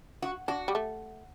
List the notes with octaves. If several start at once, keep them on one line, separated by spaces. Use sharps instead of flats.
F#4
D4 F#4
G3
A3